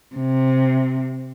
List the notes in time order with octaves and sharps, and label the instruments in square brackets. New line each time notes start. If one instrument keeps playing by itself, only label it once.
[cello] C3